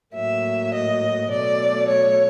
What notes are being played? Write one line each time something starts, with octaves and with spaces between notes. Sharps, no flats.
A2 F#3 A#3 E5
D#5
B2 F#3 A3 D5
C#5